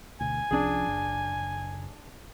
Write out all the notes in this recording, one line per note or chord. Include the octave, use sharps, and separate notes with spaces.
D2 B2 G#5
C2 F3 C#4 D4 G#4
F#1